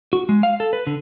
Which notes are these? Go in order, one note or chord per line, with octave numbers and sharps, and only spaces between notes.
F#4
G#3
F5
A4
B4
D3